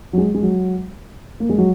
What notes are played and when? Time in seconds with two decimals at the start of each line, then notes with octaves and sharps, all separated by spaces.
0.13 F#3
0.18 G#3
0.35 G#3
0.43 F#3
1.40 A#3
1.49 G#3
1.58 F#3